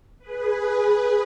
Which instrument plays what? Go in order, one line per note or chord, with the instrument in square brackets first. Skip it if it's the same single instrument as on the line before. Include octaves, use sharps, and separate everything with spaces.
[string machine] G#4 B4